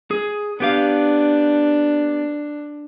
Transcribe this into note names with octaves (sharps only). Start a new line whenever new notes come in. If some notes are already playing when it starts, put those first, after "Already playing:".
G#4
B3 D4 G4 F5